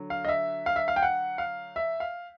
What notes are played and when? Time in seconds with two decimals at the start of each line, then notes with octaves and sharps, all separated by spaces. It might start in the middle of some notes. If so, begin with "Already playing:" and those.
Already playing: D3 F#3
0.10 F5
0.25 D#5
0.28 E5
0.66 F5
0.76 E5
0.88 F5
0.96 G5
1.03 F#5
1.38 F5
1.76 E5
2.00 F5